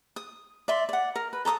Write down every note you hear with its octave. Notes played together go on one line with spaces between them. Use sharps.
D#6
D5 E5 C6
D5 F#5
A#4
B4
A4 A#5 D6 D#6